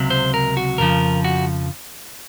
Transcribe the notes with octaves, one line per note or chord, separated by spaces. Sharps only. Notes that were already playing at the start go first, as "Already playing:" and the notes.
Already playing: C#2 C3 F#3
C5
A#4
F#4
F2 C#3 F3 A#4
F#4